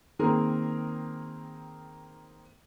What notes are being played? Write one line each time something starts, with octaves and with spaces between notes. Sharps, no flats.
D#3 A#3 C4 G#4 A#4